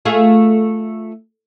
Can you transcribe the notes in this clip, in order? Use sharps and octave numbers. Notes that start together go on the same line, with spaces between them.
A3 F4 G#4